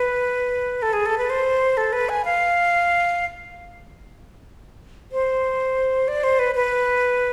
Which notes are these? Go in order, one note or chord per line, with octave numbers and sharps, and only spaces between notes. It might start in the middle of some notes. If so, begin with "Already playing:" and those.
Already playing: B4
A4
G#4
A4
B4
C5
A4
B4
G#5
F5
C5
D5
C5
B4
B4